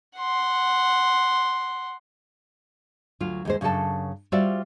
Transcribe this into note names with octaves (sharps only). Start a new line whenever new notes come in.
F#5 C6
D2 F#3 F4
D#2 G#3 C5
F#2 C#3 D4 A4 A5
G3 F4 F#4 C5 D5 E5